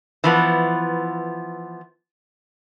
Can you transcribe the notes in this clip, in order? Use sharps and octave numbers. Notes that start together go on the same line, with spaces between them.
E3 F3 B3